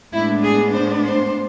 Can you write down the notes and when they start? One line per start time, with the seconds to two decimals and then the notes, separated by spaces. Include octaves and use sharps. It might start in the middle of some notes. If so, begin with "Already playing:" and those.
0.13 A2 G#3 B3 D4 E4
0.43 G#4
0.73 C5
1.02 C5